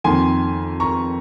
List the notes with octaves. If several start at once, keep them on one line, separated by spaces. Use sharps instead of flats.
F2 D#3 A#3 G#5 C6
A#5 C#6